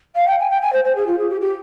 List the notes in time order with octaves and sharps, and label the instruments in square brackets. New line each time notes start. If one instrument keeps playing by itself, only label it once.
[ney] F5
G5
G#5
G5
G#5
C5
C5
G#4
F4
G#4
G4
G4